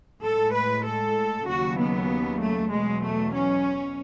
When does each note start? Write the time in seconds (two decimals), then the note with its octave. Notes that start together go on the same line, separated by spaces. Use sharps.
0.20 A2 G#3 A4
0.52 B4
0.83 A4
1.45 D#2 C#3 F#3 F#4
1.76 B3
2.38 A3
2.69 E2 B2 F#3 G#3
3.01 A3
3.32 C#4